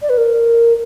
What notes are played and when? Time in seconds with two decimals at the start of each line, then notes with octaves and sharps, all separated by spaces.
0.02 D5
0.09 B4
0.17 A#4